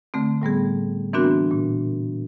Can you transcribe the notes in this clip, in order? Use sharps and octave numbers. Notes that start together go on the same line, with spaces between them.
D3 A3 C4
A2 G3 B3 G#4
E3 B3 C4 D4 F#4 A#4
A#2